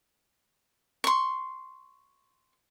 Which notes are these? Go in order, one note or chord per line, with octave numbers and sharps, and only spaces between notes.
C6 C#6